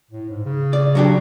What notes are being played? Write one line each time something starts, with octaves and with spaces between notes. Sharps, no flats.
A2
G#2
C#3
D5
F#3 D4 G4